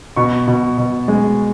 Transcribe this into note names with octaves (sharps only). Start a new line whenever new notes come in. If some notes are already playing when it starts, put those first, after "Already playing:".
B2 C#6
B2
B2
G#3